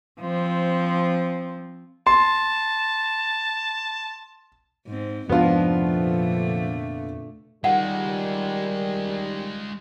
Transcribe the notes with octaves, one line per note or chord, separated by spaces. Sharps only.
F3 C4
A5 C6
G#2 C4
F2 G#2 C3 F3 G#3 B3 D4 F4
A#2 D3 A3
D#3 G3 G#3 F4 F#5